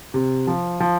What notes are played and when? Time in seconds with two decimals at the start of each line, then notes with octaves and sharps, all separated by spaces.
0.14 C3
0.47 F3
0.80 F3